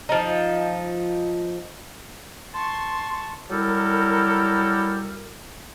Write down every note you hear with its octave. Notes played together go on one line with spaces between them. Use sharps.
F3 D#4
A5 C6 C#6
F#3 G3 E4 G4 A4 A#4